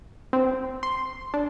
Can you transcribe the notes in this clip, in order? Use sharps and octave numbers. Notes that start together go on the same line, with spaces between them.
C4
C6
D4